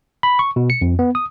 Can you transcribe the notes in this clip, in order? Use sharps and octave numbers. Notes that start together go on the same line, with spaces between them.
B5
C#6
B2
C#7
F2
B3
D#6